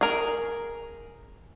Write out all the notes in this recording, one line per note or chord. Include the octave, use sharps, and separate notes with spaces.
G#4 A#4